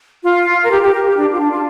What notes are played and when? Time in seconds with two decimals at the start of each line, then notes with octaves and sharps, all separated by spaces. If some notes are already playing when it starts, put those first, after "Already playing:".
0.24 F4
0.64 A#4
0.70 G4
0.82 G4
0.93 A#4
1.05 G4
1.16 D4
1.32 F4
1.39 D4
1.51 F4